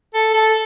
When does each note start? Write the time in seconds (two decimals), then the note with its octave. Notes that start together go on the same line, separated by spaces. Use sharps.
0.14 A4
0.34 A4